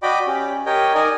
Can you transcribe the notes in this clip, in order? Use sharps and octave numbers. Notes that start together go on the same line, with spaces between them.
F#4 D5 D#5 G5 B5 D6
C#4 G4
G4 A#4 C#5 D#5 G5
D#4 A#4 D5 D#5 G#5